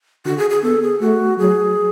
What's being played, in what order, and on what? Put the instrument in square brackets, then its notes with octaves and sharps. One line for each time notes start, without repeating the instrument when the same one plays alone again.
[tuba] D3 [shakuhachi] F#4
[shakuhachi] G#4
G#4
[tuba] B3 [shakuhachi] A4
[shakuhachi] G#4
[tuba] A3 [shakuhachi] F#4
[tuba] F#3 [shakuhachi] G#4